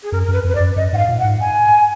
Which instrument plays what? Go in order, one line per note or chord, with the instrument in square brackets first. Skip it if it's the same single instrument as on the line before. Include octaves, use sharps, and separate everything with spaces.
[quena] G#4
[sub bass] F#2 [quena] A#4
[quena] A#4
[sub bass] F#2 [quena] B4
[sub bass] F2 [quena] B4
[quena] D5
[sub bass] F#2
[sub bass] F#2 [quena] D#5
[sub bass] G#2 [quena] F#5
[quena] F5
[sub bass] A#2
[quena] F#5
[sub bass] G#2
[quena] G#5